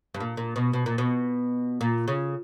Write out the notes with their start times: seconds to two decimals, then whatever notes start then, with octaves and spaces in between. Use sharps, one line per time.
0.14 G2
0.20 A#2
0.37 A#2
0.56 B2
0.73 B2
0.86 A#2
0.98 B2
1.81 A#2
2.08 C#3